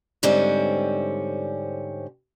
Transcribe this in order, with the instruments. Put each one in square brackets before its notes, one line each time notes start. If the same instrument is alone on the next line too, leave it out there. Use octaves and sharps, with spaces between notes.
[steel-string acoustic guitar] G#2 D3 G3 C4 C#4